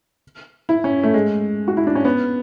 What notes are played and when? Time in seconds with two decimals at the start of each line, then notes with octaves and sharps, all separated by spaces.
0.69 E4
0.84 C#4
1.03 A3
1.14 G#3
1.68 F#4
1.77 E4
1.87 D4
1.95 C#4
2.05 B3